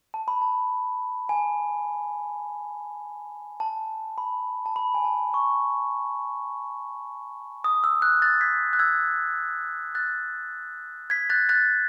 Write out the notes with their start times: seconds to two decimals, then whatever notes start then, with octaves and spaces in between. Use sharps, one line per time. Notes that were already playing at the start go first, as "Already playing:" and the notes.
0.14 A5
0.28 B5
0.41 A5
1.29 G#5
3.60 A5
4.18 B5
4.66 A5
4.76 B5
4.94 G#5
5.05 A5
5.34 C#6
7.64 D#6
7.84 E6
8.02 F#6
8.22 F#6 A6
8.41 G#6 B6
8.73 F#6
8.79 E6 G#6
9.95 F#6 A6
11.10 G#6 B6
11.30 F#6 A6
11.49 F#6 A6